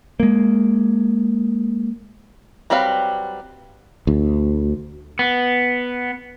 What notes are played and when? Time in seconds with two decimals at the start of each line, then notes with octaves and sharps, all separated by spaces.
0.20 G#3 A#3
2.70 F#3 G3 C4 B4 F5
4.07 D2
5.19 B3